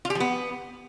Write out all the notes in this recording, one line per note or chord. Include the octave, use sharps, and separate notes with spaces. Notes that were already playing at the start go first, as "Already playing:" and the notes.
F4
G4
F3
B3